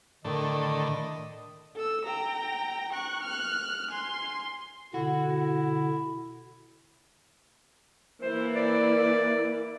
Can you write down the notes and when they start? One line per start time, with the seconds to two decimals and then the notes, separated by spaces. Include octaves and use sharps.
0.25 A2 D3 D#3 D#5
1.75 A4 E6
2.05 G5 A#5
2.93 C#6 F#6
3.23 F6 F#6
3.91 G#5 C6
4.94 B2 D3 E4 F#4
8.22 E3 A#3 E4 C5
8.56 D5